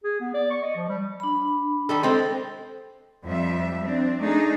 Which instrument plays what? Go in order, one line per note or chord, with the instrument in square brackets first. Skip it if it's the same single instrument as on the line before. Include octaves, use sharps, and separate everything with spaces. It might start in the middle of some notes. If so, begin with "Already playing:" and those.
[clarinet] G#4
B3
D5
C#6
D#5
F3
G3
[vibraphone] D4 B5
[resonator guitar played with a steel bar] D#3 G3 A4
[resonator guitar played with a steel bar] G#3 C4 [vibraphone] A4 C5 G5
[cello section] F2 F3 G3 E5
C4 D4
A3 D4 D#4 G#4